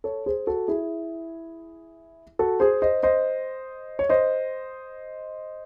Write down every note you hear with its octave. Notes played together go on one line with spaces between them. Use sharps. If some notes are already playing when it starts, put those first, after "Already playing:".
A4 C#5
G#4 C5
F#4 A4
E4 G#4
F#4 A4
G#4 C5
C5 D#5
C5 D#5
C#5
C5 D#5